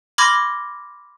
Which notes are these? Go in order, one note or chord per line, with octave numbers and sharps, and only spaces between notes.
B5 C6 D6 F6 G#6 A#6